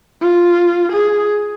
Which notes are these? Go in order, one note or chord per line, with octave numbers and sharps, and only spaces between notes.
F4
G#4